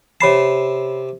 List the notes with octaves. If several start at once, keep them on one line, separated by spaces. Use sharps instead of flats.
C3 C#5 A5 B5 C7